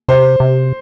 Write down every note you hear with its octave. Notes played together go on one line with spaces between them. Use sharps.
C3 C5
C3